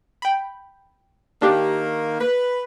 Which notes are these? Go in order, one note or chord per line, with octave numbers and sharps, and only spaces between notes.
G5 B5
D#3 A#3 D4 G4
B4